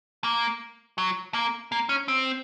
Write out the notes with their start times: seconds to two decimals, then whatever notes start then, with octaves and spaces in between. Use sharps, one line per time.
0.24 A#3
0.98 F#3
1.34 A#3
1.72 A#3
1.89 C#4
2.08 C4